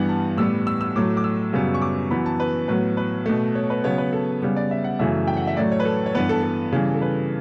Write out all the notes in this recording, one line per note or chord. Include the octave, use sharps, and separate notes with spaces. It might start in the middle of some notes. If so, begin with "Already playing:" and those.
Already playing: G2 E3 G3 B3 F#5
A5
A2 G3 B3 E6
E6
E6
A2 F#3 A3 D6
D6
E6
F#2 C#3 G3 B3
C#6
D6
F#2 E3 B3 B5
A5
B4
A2 F#3 B3 B4
B4
B2 A3
C#5
B4
C#3 F#3 B3 C#5
B4
A4
C#3 G3 B3
D5
E5
F#5
F#2 C#3 E3 A3 E5
G5
F#5
E5
A2 F#3 A3 D5
C#5
B4
A4
C#5
G2 E3 B3 B4
A4
A4
C#3 E3 G3
A4
B4